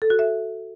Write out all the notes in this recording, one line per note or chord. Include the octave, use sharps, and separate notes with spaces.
A4
F#4
E5